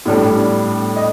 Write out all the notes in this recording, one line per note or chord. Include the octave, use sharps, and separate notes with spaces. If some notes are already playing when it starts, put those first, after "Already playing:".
A2 G3 D4
D#5